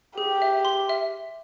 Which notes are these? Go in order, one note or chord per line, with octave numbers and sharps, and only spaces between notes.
G4 G#4
E5
C6
E5